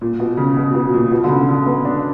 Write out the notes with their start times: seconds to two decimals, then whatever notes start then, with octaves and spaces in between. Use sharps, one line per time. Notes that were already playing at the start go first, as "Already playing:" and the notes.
0.01 A#2
0.20 B2
0.37 C#3
0.57 B2
0.75 B2
0.94 A#2
1.12 B2
1.24 D3
1.29 C#3
1.49 D3
1.66 B3
1.85 D4